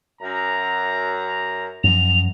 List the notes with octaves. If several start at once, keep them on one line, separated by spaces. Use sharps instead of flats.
F#2 A#5
F#2 F3 F7